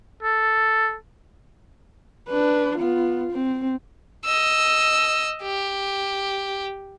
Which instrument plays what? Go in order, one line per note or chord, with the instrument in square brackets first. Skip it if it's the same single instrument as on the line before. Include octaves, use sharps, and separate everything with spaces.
[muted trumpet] A4
[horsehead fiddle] D4 B4
B3 F4
C4
[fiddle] D#5 E6
G4